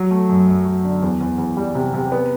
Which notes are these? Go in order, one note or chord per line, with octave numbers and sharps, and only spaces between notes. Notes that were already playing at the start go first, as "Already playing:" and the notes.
Already playing: F#3
A3
F#2
F#2
F#3
D3
E2
E2
E2
G3
C3
C3
B3